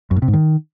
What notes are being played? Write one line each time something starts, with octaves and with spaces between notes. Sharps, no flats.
F#2
A2
C3
G#2
D#3